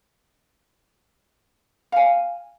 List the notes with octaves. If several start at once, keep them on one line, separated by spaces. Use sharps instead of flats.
F5 G#5